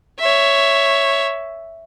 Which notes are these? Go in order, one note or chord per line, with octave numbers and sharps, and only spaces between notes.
C#5 E5